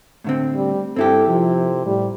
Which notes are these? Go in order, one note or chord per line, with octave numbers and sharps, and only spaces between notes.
A2 D3 C4
G3
G2 C4 E4 G4 A4
C3 F3
A2 G3